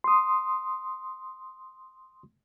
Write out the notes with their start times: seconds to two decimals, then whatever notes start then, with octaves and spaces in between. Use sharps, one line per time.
0.04 C6 D#6